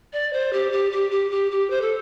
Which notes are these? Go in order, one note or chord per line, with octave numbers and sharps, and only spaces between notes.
D5
C5
G4
G4
G4
G4
G4
G4
C5
A4